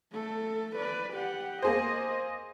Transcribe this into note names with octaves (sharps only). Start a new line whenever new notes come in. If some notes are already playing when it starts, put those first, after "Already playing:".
A3 A4
B4 D5
G4 F#5
A#3 G#4 C5 D#5